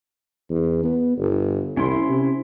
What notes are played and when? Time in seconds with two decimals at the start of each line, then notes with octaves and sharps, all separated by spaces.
0.49 E2
0.84 B3
1.18 G1
1.77 C2 C#4 E4 C6
2.08 C3